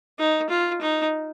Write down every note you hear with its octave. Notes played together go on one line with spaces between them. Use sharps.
D#4
F4
D#4